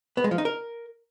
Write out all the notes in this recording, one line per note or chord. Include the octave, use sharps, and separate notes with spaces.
B3
G#3
F3
D#4
A#4